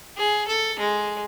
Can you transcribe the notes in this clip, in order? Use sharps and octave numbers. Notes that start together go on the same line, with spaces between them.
G#4
A4
G#3